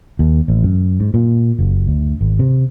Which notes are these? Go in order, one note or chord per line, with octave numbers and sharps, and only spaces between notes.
D#2
A1
F#2
G#2
A#2
F#1
D2
G#1
C3